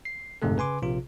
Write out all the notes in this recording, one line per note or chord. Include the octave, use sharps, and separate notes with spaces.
C7
G1 F2 G#2 C3 A3 A4
C#3 B4 G#5 C6 D6
A#1 C3 F4